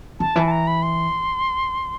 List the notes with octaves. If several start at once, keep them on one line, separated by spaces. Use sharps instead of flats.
D#3 A5
E3
A5
A#5
B5
C6